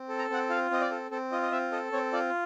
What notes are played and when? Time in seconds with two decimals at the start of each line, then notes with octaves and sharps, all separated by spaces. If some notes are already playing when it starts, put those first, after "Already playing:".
Already playing: C4
0.09 A4
0.19 A#5
0.30 C4 F#5
0.49 F4 F5
0.71 C4 D#5
0.81 D5
0.91 A4
1.11 C4 A4
1.32 F4 D#5
1.42 D#5
1.52 C4 E5
1.72 A4 D#5
1.92 C4 C#5
2.13 F4 D5